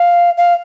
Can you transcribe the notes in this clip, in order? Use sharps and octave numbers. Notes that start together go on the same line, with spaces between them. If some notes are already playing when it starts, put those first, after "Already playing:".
Already playing: F5
F5